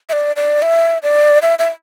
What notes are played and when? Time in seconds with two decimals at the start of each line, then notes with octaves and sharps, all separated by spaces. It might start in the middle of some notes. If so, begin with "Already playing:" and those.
0.09 E5
0.13 D5
0.36 D5
0.62 E5
1.03 D5
1.42 E5
1.59 E5